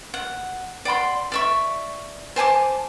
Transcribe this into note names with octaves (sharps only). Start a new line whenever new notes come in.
F#5
D5 F#5 B5 C6
D5 E5 C#6
C5 G#5 A5 D6